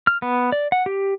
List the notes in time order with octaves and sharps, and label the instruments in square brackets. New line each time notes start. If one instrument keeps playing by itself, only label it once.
[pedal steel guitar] F6
B3
D5
F#5
G4